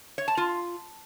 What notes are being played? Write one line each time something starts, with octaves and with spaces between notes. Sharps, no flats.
C#5
A5
F4